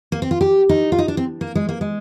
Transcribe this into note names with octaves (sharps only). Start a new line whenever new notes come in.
A#3
C4
F4
G4
D#4
F4
D#4
D4
C4
A#3
G#3
A#3
G#3